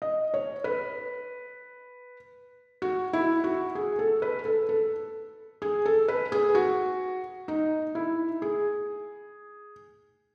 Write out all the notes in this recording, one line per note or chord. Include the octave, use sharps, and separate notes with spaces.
D#5
C#5
B4
F#4
E4
F#4
G#4
A4
B4
A4
A4
G#4
A4
B4
G#4
F#4
D#4
E4
G#4